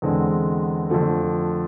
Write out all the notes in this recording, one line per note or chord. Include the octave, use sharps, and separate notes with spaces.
E2 D3 G#3 C4
F2 D3 F3 A3